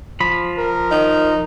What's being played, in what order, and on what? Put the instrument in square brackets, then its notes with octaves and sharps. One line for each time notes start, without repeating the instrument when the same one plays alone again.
[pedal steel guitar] F3 B5
[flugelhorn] A#4
[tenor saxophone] D#4